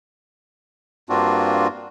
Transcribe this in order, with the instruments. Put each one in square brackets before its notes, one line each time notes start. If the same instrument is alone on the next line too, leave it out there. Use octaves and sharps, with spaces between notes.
[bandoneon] G2 A#3 C4 D4 F4 F#4